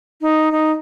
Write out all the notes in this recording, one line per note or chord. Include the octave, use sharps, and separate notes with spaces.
D#4
D#4